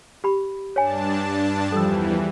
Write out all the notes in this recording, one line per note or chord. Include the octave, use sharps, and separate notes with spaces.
G4 B5
G2 D4 C#5 G#5 A5
E2 E3 F3 G3 A4 E6